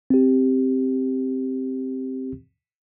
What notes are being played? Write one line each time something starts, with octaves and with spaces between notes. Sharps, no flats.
C4 G4